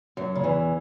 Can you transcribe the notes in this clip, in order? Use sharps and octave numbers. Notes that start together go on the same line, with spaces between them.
F#2 F#3
C#3
E2 E3